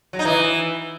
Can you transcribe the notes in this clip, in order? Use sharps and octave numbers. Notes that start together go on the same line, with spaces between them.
F#3
D#4
E3